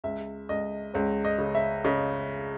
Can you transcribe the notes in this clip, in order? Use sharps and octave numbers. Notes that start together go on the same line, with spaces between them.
C#2 E5
C#2 D#5
C#2 C#5
D#5
C#3
E5
C#3 D#5